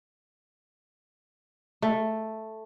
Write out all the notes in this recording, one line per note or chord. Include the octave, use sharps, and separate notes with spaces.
A3